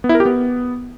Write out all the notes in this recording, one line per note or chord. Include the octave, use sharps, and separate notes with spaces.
B3
E4
A#4
G4
B3